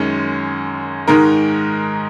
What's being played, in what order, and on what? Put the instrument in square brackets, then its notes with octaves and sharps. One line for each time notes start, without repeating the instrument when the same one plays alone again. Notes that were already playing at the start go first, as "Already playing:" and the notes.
Already playing: [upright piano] F#2 D#3 G#3 C#4
G#2 D#3 G#3 D#4 A#4